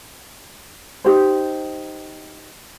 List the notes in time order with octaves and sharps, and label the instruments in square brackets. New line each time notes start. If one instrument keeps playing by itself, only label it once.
[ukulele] D#4 G4 C5